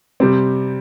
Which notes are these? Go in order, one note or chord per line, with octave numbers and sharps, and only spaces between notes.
C3 G3 C4